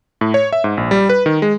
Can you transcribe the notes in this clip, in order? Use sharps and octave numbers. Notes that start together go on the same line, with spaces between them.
A2
C#5
E5
G#2
A#1
G3
B4
D#3
G#3